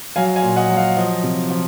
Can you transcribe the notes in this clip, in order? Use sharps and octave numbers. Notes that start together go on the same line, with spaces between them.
F#3 F5 G#5
F5 G#5
A#2
D#5 F#5
F#3
F5
F3 D#5
C3
F3